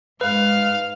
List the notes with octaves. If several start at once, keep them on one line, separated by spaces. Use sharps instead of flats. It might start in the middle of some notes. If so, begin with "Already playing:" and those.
G#2 G#3 B4 F5